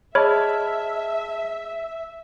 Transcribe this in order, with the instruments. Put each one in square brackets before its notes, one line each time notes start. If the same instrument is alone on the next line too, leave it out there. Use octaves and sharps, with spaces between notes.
[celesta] G#4 D#5 [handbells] C#5 B5 [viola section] E5 [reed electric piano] A5 F6